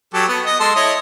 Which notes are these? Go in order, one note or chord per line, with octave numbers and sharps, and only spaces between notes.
F#3 G4 A4
B3
D#5
G#3 A4 C6
E4 C#5 D#5